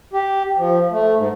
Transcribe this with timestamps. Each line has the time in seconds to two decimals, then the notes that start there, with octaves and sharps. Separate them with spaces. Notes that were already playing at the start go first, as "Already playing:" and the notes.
0.13 G4
0.58 F3
0.91 A3
1.16 G#2